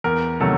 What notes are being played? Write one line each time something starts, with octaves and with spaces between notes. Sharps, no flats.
E2 A#4
C3 D#3 F#3 A3 A4